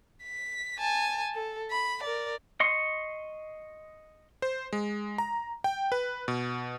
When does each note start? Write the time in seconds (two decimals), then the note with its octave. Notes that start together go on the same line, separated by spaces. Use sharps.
0.24 B6
0.79 G#5 A5
1.35 A4
1.71 B5
2.03 A#4 D5
2.60 D#5 C6 C#6
4.42 C5
4.73 G#3
5.18 A#5
5.64 G5
5.92 B4
6.28 B2